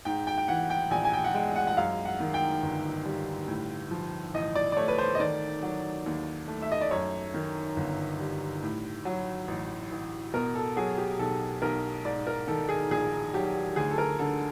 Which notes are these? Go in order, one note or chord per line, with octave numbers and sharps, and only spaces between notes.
G#2 G5
G5
G5
E3 F#5
G5
A#1 G#5
G#5
G5
F#5
G#3 G5
F#5
F#5
F#2 F5
F#5
D#3
G5
G1
G3
A2
F3
A1 D#5
D5
D5
A3 C#5
B4
C5
D#5
D#3 D5
F#3
D#2
A3
E5
D#5
D5
F#2 C#5
D#3
G1
G3
A2
F#3
A1
A1
B2 A#4
A4
F#3 G#4
G4
B1 A4
B1 A#4
G#2 D5
A#4
D#3 A4
G#4
A#1 G#4
F#3 G4
D2 G#4
A4
A#4
D3 A4